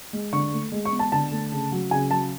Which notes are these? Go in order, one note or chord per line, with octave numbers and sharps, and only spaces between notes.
G#3
D3 C#6
A3
G#3
C#6
B3
A5
D3 A5
A3
C#3
F#3
C#3 G#5
F#3 A5